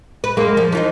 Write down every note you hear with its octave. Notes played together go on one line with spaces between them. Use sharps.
B4
F#2 G#3 A#3
F3
E3 F3 D#4